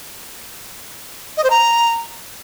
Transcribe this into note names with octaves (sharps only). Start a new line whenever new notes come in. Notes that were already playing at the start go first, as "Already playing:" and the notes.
D#5
C5
A#5